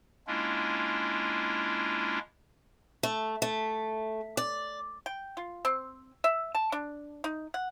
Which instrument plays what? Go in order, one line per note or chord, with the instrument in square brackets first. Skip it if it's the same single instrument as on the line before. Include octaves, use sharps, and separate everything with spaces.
[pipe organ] G#3 A#3 C#4 D4 E4 F4
[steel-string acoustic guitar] A3
A3
D5
[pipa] G5
F4
C4
E5
A5
D4
D#4
F#5